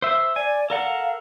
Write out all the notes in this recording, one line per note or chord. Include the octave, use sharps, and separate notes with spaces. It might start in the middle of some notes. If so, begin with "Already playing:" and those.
C5 E5
D5 G#5
A4 A#4 F5 F#5